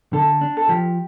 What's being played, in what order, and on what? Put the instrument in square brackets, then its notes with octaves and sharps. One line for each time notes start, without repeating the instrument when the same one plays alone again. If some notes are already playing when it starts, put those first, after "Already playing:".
[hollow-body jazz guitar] D3 [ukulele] A4
[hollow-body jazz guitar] D4
[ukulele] A4
[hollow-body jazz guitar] F3 [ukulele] G4